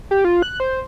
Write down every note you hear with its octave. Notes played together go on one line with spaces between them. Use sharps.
G4
F4
F#6
C5